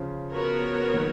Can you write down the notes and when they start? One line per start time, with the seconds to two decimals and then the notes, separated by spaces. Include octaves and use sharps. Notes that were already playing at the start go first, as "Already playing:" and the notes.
Already playing: C#3 F3
0.31 B3 F#4 A#4 C#5
0.93 D#3 F#3